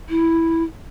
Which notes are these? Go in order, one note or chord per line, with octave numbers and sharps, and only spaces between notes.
E4